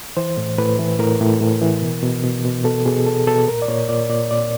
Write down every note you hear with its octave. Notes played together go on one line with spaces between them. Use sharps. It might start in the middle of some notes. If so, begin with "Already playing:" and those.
E3 C5
A2
A2 B4
E3
A2 A#4
A2
A2
E3
B2
B2
B2
B2
B2 A4
B2 G#4
B2 A4
B2 A4
A#2 A#4
D5
A#2 C#5
A#2 D5
A#2 D5
A#2 D5